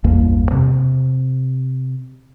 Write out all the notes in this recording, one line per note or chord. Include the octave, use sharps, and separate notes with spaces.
A1 E2 G2 A#3
C3